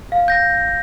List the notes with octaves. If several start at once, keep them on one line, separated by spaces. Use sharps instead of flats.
F5
G6 A#6